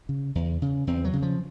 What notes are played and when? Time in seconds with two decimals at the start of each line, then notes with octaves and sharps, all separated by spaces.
0.09 C#3
0.35 E2
0.62 C#3
0.87 E2 C4
1.05 F#3
1.13 C#3
1.22 F3